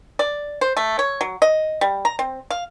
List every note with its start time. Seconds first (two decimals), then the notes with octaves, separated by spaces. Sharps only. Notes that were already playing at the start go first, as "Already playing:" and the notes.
0.19 D5
0.61 C5
0.77 A3
0.99 C#5
1.21 F#3
1.42 D#5
1.81 G3
2.05 A#5
2.19 C4
2.50 F5